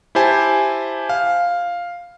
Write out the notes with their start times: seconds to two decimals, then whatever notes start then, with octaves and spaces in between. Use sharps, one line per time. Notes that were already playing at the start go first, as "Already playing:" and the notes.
0.15 E4 G4 C5 G#5 A5
1.09 F5